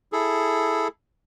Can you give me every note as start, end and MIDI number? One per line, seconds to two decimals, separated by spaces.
0.13 0.88 64
0.13 0.88 68
0.13 0.88 69